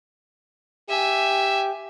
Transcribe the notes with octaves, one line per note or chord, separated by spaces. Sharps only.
G4 E5 G#5